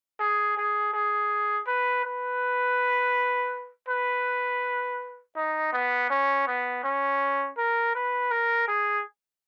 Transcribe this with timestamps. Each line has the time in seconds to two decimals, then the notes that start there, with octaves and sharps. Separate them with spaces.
0.19 G#4
0.58 G#4
0.94 G#4
1.67 B4
2.05 B4
3.88 B4
5.36 D#4
5.73 B3
6.10 C#4
6.47 B3
6.83 C#4
7.58 A#4
7.95 B4
8.31 A#4
8.68 G#4